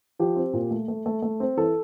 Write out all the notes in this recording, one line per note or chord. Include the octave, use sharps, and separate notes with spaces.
F3 G4
C4
A#2
A3
A3
A3
A3
C4
E3 A4